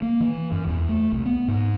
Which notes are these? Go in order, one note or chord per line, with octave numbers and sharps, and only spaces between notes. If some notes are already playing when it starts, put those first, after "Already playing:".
A#3
E3
F#2
E2
A3
C2
B3
G#2